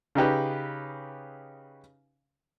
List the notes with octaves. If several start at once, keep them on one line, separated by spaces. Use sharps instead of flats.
C#3 D#4 G4 B4